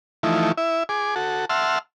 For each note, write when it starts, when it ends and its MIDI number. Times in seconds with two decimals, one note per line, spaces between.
0.23 0.52 52
0.23 0.52 53
0.23 0.52 57
0.23 0.52 63
0.23 0.52 64
0.57 0.83 64
0.57 0.83 76
0.89 1.15 68
0.89 1.15 86
1.16 1.45 66
1.16 1.45 69
1.50 1.79 76
1.50 1.79 78
1.50 1.79 81
1.50 1.79 84
1.50 1.79 88
1.50 1.79 89